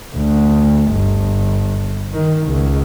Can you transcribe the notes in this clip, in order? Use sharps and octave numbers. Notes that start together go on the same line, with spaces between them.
D2
G1
D#3
C#2